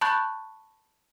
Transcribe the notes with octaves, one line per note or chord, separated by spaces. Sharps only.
A5 B5 C#6 F#6 G6 A6